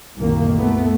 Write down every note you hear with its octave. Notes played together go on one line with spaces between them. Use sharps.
C2 F#2 A#2 D#3 A#3
A3 B3